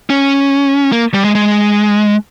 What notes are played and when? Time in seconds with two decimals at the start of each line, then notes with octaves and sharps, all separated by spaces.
0.10 C#4
0.92 A#3
1.14 G3
1.24 G#3
1.35 G#3